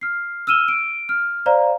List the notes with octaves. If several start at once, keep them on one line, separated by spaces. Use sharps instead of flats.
F6 C7
E6 F6 D#7 E7 G7
D7
F6
C5 D5 F5 A#5